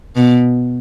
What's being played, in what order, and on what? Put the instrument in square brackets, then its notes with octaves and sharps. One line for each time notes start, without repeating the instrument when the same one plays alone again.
[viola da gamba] B2